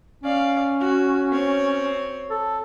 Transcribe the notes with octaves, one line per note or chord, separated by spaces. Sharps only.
C#4 D5 F5
F#4
C4 C#5
A4